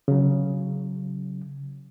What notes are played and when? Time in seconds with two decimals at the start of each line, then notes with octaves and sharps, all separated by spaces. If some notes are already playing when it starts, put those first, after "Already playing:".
0.08 C#3 F#3